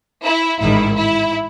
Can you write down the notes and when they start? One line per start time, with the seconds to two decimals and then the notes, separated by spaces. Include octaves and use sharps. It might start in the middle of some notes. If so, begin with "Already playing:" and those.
0.23 E4
0.59 A1 G#2 D#3 E4
0.95 E4